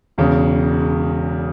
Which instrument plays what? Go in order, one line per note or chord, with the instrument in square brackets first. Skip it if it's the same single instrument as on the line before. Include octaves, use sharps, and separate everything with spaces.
[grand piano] E1 E2 C#3